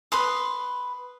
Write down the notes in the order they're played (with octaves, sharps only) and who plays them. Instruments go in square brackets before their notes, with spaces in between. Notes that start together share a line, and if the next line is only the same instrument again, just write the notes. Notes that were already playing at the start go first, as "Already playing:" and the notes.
[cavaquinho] B4 B5 C6 D#6